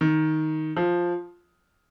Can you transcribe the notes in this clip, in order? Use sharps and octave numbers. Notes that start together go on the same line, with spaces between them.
D#3
F3